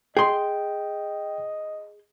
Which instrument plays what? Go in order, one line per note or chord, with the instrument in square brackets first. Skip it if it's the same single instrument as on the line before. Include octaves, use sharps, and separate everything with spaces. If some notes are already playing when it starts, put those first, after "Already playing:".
[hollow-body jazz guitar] G#4 C6 [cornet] D#5 [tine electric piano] G5